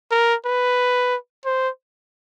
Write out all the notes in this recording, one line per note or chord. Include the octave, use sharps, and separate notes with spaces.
A#4
B4
C5